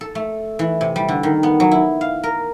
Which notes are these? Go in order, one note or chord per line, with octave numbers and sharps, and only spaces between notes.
A4
A3
E3
C3
G3
D3
D#3
B3
F#3
E4
F5
A#4